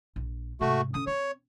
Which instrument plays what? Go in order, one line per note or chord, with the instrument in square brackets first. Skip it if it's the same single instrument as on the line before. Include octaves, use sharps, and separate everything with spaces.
[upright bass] A#1
[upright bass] G#2 C3 [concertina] A3 F#4
[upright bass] D3 C#4 [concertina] D#6
[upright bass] C4 [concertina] C#5